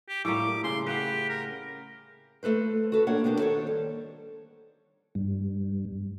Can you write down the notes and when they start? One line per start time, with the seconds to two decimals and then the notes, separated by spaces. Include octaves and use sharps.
0.09 G4
0.25 A2 G3 A#3 D6
0.64 C#3 C6
0.86 G4 B4 F#5
1.29 A#4
2.43 A3 A4 B4 C5
2.92 F#4 A4 B4
3.07 A#3 D4 A#4 C#5 F#5
3.24 B3 D4 F#4 G4
3.38 D#3 A4 C5 C#5
3.67 G3
5.15 G2